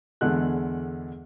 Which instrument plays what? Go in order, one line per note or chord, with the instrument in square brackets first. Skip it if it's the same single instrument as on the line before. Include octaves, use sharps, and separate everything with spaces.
[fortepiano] E2 D3 G#3 A4 F#6